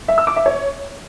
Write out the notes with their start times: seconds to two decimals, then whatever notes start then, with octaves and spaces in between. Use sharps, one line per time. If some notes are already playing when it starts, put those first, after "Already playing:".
0.08 E5
0.18 E6
0.27 D6
0.36 E5
0.46 C#5